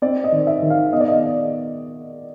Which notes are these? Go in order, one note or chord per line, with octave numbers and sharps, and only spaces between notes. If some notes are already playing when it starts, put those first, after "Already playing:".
C4 D5
D#5
D#3
E5
D#3
F5
B3 D#5
D5
D#5